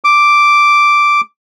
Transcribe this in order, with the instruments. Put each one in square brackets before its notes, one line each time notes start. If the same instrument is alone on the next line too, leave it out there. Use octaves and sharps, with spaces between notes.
[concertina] D6